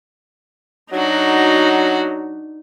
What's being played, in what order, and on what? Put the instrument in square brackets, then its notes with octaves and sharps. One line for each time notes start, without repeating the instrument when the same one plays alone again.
[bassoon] F#3 [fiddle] D4 F#4 [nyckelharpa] D#4